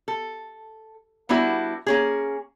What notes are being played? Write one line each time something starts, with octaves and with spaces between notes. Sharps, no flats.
A4
G3 B3 D4 E4 F#4
A#3 C#4 G#4